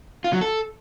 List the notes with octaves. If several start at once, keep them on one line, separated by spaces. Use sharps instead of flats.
F4
F#3
A4